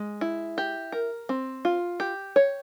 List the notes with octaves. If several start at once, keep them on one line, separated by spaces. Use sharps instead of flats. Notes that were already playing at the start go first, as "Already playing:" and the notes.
Already playing: G#3
E4
G4
A#4
C4
F4
G4
C#5